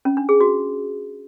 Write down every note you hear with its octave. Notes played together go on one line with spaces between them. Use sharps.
C#4
D4
G#4
F#4